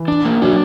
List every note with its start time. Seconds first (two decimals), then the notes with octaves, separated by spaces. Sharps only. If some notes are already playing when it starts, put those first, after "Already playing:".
Already playing: E3
0.08 D4
0.25 A#3
0.42 F#3 D4